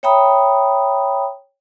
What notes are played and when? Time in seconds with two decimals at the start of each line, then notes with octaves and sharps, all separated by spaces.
0.03 C#5 E5 G5 A#5 B5 D#6